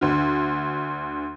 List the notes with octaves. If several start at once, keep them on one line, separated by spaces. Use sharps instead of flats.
D2 D3